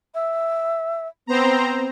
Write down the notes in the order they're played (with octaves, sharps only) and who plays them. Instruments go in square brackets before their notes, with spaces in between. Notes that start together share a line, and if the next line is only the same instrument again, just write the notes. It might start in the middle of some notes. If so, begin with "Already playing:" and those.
[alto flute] E5
[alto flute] B3 [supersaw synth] C4 C5 A#5